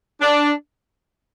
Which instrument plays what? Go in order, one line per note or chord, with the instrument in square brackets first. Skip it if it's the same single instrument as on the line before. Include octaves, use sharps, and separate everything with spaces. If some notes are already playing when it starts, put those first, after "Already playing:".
[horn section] D4